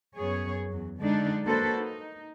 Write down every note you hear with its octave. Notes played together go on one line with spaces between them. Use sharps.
F#2 B3 G#4 C#5
E2 F#3
D3 F#3 G#3 D4 D#4 A4
A#3 D4 F#4 A4 B4 C5
D#4